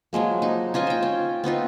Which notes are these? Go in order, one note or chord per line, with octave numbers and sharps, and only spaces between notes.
F3 F#3 G#3 A#3
D#4
C#4 F4 D#5 G#5
C5 G5
C#4
B3 C4 D#4 F4